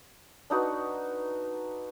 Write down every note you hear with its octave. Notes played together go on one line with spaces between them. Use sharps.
D4 D#4 F#4 B4